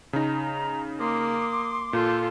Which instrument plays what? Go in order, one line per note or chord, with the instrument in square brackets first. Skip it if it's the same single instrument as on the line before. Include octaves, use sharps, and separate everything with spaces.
[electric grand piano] C#3 D#4 [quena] A#5
[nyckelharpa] A#3 [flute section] C6 D6 [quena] D#6
[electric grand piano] A#2 [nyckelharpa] F4 A4 [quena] G6